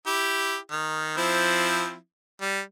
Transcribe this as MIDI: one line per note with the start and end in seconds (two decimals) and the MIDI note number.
0.06 0.57 64
0.06 0.57 67
0.72 1.17 51
1.17 1.95 53
1.17 1.95 60
1.17 1.95 64
2.41 2.60 55